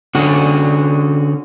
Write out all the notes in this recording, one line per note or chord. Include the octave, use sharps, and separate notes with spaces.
D3 C#4 F#4